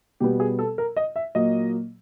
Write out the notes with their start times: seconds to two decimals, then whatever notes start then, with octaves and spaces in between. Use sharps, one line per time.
0.20 B2 G3 B3 G4
0.40 G#4
0.59 A4
0.78 A#4
0.96 D#5
1.16 E5
1.35 A#2 F#3 A#3 D#5